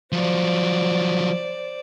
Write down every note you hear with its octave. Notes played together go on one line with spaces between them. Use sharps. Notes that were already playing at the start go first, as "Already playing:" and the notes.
F3 F#3 C5 D5